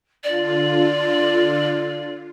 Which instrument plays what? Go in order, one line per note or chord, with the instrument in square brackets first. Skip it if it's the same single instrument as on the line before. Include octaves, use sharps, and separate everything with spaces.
[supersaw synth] D3 F4 [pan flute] D5